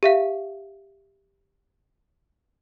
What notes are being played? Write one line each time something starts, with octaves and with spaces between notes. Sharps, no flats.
G4 E5 F5